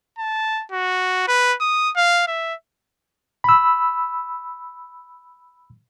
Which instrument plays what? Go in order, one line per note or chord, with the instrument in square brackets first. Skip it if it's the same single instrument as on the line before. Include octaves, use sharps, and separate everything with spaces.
[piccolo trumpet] A5
F#4
B4
D#6
F5
E5
[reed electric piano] B5 E6